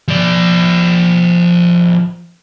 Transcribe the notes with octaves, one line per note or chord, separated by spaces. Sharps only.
F3 D5